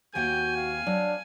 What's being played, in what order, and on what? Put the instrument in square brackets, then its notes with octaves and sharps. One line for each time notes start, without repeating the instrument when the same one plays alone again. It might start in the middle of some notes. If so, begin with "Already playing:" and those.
[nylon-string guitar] D#2 A#3 G5 [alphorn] F#4 [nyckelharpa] G#5 [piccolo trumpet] G6
[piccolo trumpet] F5
[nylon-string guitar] F#3 [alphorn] D4